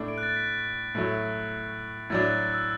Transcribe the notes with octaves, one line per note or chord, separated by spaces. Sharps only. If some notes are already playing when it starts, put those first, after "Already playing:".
Already playing: A2 A3 D4
D7
F#6
A6
B6
A2 F#3 A3
A2 F#3 D4 A6
F#6
F#6
E6